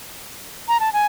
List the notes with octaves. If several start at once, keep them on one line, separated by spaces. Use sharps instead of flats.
A#5
A5
G#5